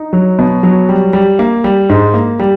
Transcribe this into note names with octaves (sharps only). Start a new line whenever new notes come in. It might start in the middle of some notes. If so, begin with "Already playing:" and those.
Already playing: D#4
F#3
B2
F#3
G3
G3
A#3
G3
G#2
A#3
G3